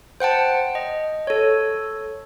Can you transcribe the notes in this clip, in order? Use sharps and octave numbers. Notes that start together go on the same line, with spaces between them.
C5 F#5 G5 A5
D#5
A4 C#5